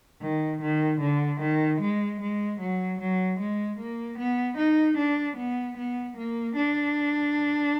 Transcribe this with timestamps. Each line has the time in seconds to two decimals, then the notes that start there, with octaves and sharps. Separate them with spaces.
0.21 D#3
0.60 D#3
1.00 D3
1.39 D#3
1.79 G#3
2.19 G#3
2.59 F#3
2.98 F#3
3.38 G#3
3.78 A#3
4.17 B3
4.57 D#4
4.97 D4
5.36 B3
5.76 B3
6.16 A#3
6.55 D4